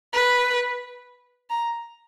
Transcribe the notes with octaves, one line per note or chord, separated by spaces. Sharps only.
B4
A#5